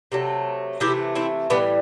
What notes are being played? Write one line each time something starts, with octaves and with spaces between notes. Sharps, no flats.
C3 F#3 A3
C3 E3 A3 E4 G4
C4 E4
A2 E3 G3 B3 D4